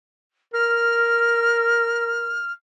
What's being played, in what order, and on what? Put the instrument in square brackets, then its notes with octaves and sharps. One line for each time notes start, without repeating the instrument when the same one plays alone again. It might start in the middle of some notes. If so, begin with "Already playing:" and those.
[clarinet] A#4 [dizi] F6